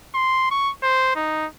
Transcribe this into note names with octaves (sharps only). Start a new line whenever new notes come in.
C6
C#6
C5
D#4